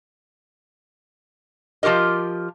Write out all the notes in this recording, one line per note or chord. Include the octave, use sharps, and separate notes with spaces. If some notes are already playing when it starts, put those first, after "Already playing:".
F3 F4 G4 A#4 D#5